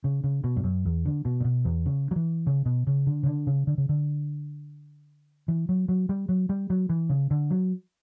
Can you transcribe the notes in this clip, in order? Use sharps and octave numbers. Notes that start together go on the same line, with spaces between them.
C#3
C#3
B2
G2
F#2
E2
D3
B2
A#2
B2
E2
C#3
F#3
E3
C#3
B2
C#3
D3
C#3
D3
C#3
D3
C#3
D3
E3
F#3
F#3
G3
F#3
G3
F#3
E3
C#3
D3
F#3